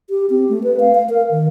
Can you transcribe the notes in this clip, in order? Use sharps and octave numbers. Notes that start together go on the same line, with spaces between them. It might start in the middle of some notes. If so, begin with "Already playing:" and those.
G4
C4
A3
B4
F5
F5
A#4
D#3